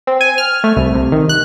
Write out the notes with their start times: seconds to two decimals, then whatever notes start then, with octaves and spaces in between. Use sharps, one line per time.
0.07 C4
0.21 G#5
0.38 F6
0.64 A3
0.77 C2
0.95 C3
1.12 D#3
1.29 F#6